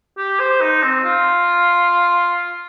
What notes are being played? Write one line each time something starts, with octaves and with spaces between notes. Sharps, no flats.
G4
C5
D#4
C4
F4